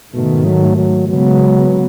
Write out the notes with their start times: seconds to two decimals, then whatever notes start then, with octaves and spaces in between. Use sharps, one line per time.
0.14 G#2 B2 D#3 A3
0.45 F#3
0.76 F#3
1.08 C#3 F#3 G#3 B3